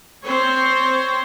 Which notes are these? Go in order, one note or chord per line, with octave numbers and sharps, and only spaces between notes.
C4 C5 C#5